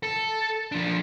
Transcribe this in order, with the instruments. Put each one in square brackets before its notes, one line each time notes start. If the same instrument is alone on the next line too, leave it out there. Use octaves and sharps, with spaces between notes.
[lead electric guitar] A4
F3 D4